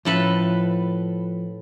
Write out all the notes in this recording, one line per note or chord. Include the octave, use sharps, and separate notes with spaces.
A2 F3 C#4 F4 A4 B4